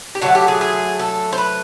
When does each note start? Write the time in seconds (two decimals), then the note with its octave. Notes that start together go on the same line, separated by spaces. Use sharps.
0.15 G4
0.21 D3 F#3 A3 F#4
0.35 G4
0.48 G#4
0.61 G#4
0.99 A4
1.33 C5
1.38 B4